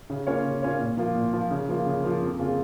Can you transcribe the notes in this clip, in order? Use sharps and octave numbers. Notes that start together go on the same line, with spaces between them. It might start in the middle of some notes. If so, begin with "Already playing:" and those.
C#3
A#3 C#4 F4 C#5
C#3
A#3 C#4 F4 C#5
A#2
F3 A#3 F4
A#2
F3 A#3 F4
C#3
F3 A#3 F4
C#3
F3 A#3 F4
F2
C#3 A#3 F4 G#4